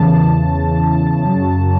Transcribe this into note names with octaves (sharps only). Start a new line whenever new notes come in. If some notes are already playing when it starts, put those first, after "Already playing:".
Already playing: E2 C#3 E3 A5
F#2 C#3 F#3